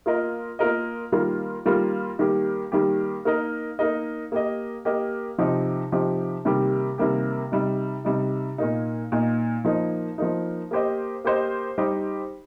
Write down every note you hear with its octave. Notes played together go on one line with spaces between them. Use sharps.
A#3 F4 A#4 D#5
A#3 F4 A#4 D#5
D#3 G3 A#3 F4 A#4
D#3 G3 A#3 F4 A#4
D#3 G3 A#3 G4
D#3 G3 A#3 G4
A#3 D#4 A#4 D#5
A#3 D#4 A#4 D#5
A#3 G4 D#5
A#3 G4 D#5
C3 F3 D#4 G4
C3 F3 D#4 G4
C3 D#3 G3 A#3 G4
C3 D#3 G3 A#3 G4
C3 G3 D#4
C3 G3 D#4
A#2 A#3 D#4
A#2 A#3 D#4
F3 A#3 D#4
F3 A#3 D#4
A#3 G4 C5 D#5
A#3 G4 C5 D#5
G3 D#4 G4 C5 D#5